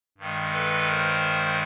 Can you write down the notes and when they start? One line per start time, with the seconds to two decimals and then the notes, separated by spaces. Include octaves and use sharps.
0.18 G2 D#3 G#3
0.52 A4 B4
0.87 A#4 C5